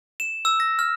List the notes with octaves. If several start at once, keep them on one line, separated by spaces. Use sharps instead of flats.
E7
E6
A#6
F6